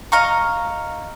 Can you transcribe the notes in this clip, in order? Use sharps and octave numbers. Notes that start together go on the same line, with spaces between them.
D#5 F5 A#5 C#6